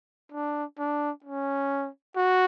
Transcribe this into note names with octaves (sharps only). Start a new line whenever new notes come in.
D4
D4
C#4
F#4